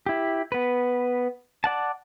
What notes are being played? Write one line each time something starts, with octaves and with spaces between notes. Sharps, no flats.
E4 G4
B3 B4
D5 F#5 A5